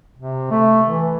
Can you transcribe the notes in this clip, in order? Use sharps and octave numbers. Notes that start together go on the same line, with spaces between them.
C3
A3
E3